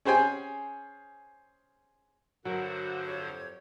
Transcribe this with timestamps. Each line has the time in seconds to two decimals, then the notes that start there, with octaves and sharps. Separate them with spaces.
0.05 C#4 G#4 C5 G5 G#5
2.45 G2 D3 F#3 F#4 A#4 C5
3.06 F2 G4 C#5